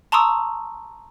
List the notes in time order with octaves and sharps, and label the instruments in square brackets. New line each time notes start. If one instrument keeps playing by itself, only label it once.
[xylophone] A5 A#5 C6 C#6 D#6 E6